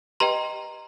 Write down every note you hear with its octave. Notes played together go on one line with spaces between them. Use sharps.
G4 B4 D#5 G5 A#5 C6